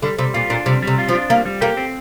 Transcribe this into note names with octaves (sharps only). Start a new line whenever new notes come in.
D3 G3
C3 G3
A#2 F4
A#2 D4
C3 G3
C3 G3
F4
F3
D4
G3 A#3
G3
A#3 G4
C4